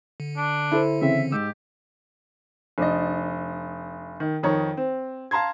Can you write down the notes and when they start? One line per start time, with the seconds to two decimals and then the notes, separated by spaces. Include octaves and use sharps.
0.20 D3
0.37 D4
0.71 E4 A4 C5
1.02 C#3 E3 C4 E5
1.32 G#2 G4 E6
2.78 F1 D4 D#5
4.20 D#3
4.43 F2 D#3 C#5 A#5
4.77 C4
5.31 F5 A5 A#5 C6 G#6